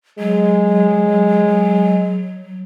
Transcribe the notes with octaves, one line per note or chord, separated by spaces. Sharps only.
F#3 G#3